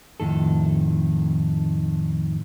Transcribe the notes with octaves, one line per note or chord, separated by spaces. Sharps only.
F2 A2 D#3 A4